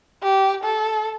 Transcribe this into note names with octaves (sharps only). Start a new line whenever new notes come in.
G4
A4